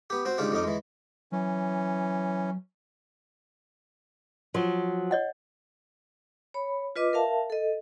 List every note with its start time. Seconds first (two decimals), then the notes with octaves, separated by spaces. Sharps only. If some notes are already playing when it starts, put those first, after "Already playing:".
0.10 B3 G4
0.25 C4 F#4 C5
0.38 G#2 C#3 D4 F4 G4
0.52 F2 C#4 D#4 D6
0.64 E3 G#3
1.32 E3 F#3 C#4
4.54 F3 F#3
5.11 C#5 D#5 F#5
6.54 C#5 B5
6.96 F4 B4 D#5 D6
7.13 A#4 E5 F5 A5
7.50 A4 D#5